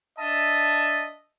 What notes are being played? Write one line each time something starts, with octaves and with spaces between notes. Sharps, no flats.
D4 D#5 E5 A5